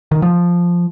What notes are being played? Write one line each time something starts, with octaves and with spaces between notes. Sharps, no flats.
D#3
F3